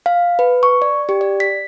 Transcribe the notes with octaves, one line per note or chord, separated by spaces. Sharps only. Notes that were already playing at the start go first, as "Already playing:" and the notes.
F5
B4
C#6
D5
G4
D5
B6